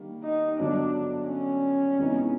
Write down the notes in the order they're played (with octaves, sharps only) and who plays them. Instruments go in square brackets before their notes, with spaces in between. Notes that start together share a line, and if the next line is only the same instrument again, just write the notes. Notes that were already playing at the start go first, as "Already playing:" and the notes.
Already playing: [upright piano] D#3 G3 A#3
[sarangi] D#4
[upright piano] G2 D3 F#3 B3 [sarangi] D4
[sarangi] C#4
[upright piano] C3 E3 G#3 B3 D#4